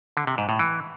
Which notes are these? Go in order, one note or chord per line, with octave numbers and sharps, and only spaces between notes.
D3
C3
G#2
A2
E3